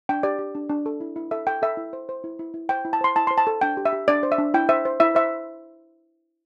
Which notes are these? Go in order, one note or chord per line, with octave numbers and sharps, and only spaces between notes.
D4 G5
G4 D5
G4
D4
D4
A4
E4
E4
A4 E5
A4 G5
A4 E5
E4
C5
C5
E4
E4
E4
C5 G5
E4
A5
C5 C6
E4 A5
C5 C6
A5
A4
D4 G5
G4
E5
G4
D4 D5
C5
E5
D4
E4 G5
C5 E5
C5
E4 E5
C5 E5